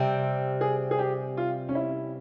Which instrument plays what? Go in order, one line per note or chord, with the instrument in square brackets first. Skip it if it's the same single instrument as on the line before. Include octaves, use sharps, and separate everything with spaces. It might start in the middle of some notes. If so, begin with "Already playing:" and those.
Already playing: [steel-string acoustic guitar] C3 G3 C4
[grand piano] G#4
G#4
G4
F4
C#4
E4